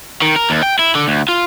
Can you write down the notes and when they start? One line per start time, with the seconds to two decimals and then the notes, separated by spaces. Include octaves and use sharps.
0.22 D#3
0.36 A#4
0.50 D#2
0.63 G5
0.79 E4
0.95 D3
1.08 D2
1.29 F4